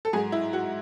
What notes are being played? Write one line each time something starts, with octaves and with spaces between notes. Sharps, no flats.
A4
G#2 F#3 G#4
E4
F#4